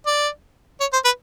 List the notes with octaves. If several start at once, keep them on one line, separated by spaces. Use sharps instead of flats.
D5
C#5
C5
B4